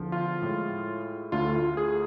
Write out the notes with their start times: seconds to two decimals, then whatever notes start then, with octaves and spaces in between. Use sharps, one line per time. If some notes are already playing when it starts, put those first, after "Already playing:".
Already playing: E2 D3 F3
0.12 F4
0.42 A2 G#3
1.32 D2 D3 A3 F4
1.55 F4
1.77 G#4